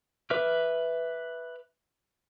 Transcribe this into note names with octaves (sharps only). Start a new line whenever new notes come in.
B4 E5 D6 F6